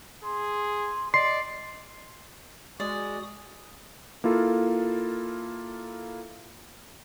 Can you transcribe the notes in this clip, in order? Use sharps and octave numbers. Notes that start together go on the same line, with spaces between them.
G#4 C6
D5 D#5 C6 C7
G#3 F#4 D5 D#6
A#3 E4 F4 A4